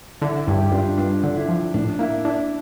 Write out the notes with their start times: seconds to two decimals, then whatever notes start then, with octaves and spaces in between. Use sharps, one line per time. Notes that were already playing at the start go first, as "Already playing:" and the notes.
0.21 D3 E4
0.47 G2 E4 G4
0.60 G4
0.72 G2 D4 F4
0.98 G2 D4
1.23 D3
1.36 E4
1.49 F3
1.74 A2 D4
1.99 A#3 E4
2.25 D4 E4